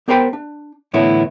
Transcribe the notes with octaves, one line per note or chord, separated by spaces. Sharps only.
B3 G4 A#4 C5 G5 B5
D4
E2 A2 D3 B3 E4 C#5